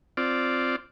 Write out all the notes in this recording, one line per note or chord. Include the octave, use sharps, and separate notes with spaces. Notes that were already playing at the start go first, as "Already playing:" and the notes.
C4 F4 D5